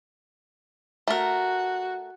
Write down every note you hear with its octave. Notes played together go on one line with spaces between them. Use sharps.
A3 F#4 A#4